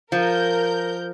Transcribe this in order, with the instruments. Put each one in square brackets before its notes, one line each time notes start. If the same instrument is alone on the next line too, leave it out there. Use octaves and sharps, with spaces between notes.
[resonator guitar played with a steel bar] F3 [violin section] A#4 G6